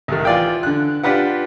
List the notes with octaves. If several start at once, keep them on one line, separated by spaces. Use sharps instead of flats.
C2 A2 D#3
E3 F4 D5 F5 G5
D3 F#6
D4 F4 G4 B4 F#5